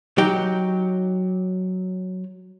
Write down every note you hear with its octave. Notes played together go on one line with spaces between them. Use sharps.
F#3 D#4 G4